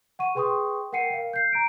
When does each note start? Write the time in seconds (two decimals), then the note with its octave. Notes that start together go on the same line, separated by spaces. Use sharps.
0.19 F#5 C#6 D#7
0.35 G#4 B4 G5 C6 C#6 D#6
0.93 A#4 F#5 G5 C7 C#7 D#7
1.10 A#4 F5
1.33 G6 C7
1.52 A#5 D7